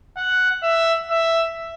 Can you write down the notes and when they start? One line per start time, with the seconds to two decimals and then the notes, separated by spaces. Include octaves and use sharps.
0.17 F#5
0.63 E5
1.10 E5